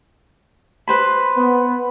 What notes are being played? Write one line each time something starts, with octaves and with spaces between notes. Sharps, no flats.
B4 C5 B5
B3